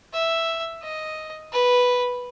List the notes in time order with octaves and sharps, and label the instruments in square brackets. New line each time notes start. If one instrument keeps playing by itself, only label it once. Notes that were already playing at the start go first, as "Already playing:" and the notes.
[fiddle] E5
D#5
B4